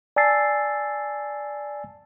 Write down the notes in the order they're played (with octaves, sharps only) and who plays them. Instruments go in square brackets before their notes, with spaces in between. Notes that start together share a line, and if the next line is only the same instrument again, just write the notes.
[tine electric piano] D5 G#5 A5 E6 A6 C7